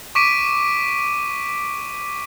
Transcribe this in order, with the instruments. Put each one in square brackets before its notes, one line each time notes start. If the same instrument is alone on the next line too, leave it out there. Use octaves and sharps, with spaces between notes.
[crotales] C#6 D6 B6 D7 D#7